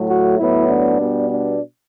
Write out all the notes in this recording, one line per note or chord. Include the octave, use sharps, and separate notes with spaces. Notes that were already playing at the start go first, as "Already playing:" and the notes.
Already playing: A2 F#3 A3
F#4
A2 F#3 B3 E4
D4
B2 G3 B3
D4